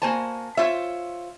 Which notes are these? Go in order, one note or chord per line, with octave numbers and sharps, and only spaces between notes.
A#3 F#4 C5 G#5 A5
F4 C5 C#5 E5